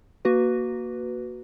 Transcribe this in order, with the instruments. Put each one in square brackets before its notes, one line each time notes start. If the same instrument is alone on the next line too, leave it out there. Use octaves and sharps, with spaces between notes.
[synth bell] A#3 F#4 B4